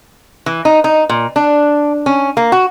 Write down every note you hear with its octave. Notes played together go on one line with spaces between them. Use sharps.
E3
D#4
D#4
A#2
D4
C#4
A#3
F#4